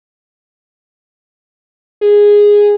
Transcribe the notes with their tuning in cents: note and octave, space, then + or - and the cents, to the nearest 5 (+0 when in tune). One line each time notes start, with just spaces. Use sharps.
G#4 -10